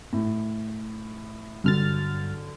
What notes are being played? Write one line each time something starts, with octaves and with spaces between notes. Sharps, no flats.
A2
G2 D3 F#3 F6 A6